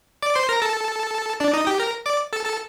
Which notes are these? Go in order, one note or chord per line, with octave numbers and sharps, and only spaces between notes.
D5 D6
C5 C6
A#4 A#5
A4 A5
D4 D5
D#4 D#5
G4 G5
A#4 A#5
D5 D6
A4 A5
A4 A5